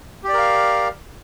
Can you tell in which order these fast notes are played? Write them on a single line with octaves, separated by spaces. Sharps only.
G4 D5 A#4 F5